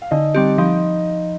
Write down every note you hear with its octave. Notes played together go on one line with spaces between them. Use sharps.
F5
D3 D#4 D#5
G3 C4 G4
F3 D#4 D#5